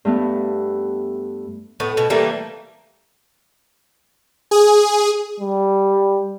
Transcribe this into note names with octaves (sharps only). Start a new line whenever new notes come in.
G2 A3 B3
A2 B3
B2
E3 G3 A3 A#3
G#4
G3